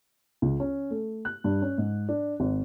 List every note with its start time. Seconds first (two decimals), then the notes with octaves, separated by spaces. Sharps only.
0.42 C#2
0.60 C#4
0.90 A3
1.25 F#6
1.44 G2
1.62 C#4
1.78 G#2
2.09 D4
2.40 G#1